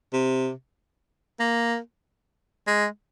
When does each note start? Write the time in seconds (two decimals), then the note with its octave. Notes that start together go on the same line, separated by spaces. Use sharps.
0.13 C3
1.40 A#3
2.67 G#3